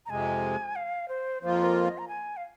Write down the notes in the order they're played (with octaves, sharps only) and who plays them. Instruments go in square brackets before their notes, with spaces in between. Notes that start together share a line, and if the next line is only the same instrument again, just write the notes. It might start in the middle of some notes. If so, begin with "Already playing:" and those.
[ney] A#5
[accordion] F2 C3 G#3 [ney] G#5
[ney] F5
C5
[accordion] F2 F3 A#3 F4 [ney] C5
[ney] A#4
D#5
A#5
G#5
F5